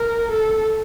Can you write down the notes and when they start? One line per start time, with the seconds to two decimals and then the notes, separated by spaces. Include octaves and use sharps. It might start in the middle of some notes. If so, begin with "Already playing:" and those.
Already playing: A#4
0.31 A4